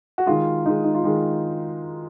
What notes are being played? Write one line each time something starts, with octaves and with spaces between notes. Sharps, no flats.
F#4
D#3 G#3 F4
D#3 G#3 D#4
D#4
F4
D#3 G#3